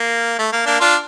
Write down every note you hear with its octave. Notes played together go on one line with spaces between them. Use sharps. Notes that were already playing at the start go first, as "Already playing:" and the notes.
Already playing: A#3
A3
A#3
A#3 D4
D4 F4